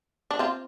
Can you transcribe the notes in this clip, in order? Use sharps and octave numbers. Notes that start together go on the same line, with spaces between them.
D4
C4 F4